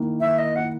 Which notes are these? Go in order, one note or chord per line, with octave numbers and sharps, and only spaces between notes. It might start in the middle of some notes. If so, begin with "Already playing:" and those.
Already playing: D#3 A#3 E4
D#3 E5
D#5
A#3 E4 F#5